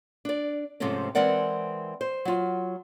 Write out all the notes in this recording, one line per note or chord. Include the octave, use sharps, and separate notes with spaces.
D4 D5
G#2 C3 F3 A3 C4 C#4
E3 G#3 C4 A#4 D5 F#5
C5
F#3 F4